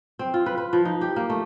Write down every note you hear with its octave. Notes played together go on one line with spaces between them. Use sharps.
C4
F4
B4
B4
F3
D#4
G4
A#3
A3